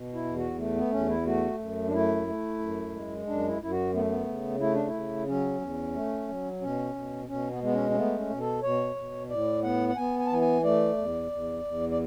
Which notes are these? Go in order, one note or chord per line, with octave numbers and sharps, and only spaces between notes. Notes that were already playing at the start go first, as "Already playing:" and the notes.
Already playing: B2
E4
E2
F#4
A3
B3
E2 C#4
E4
A3 F#4
F#2
D4
A3 E4
A3
F#2
G#3
F#2 D4
E4
F#2 E4
F#4
A3 B3
B3
C#3
A3 E4
D4
E4
C#3
F#3 C#4
E2
A3
F#3
B2 C#4
B2
B2 C#4
B3
G#3 B3
C#4
C#4
A3 B3
C#4
B2
A4
B2 C#5
B2
A2 D5
B3 F#5
F#5
B3 G#5
G#5
A5
E3 G#5
G#5
A3 D5
E2
E2
E2
D5